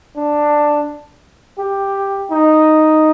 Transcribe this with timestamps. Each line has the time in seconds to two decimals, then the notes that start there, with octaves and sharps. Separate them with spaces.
0.16 D4
1.59 G4
2.31 D#4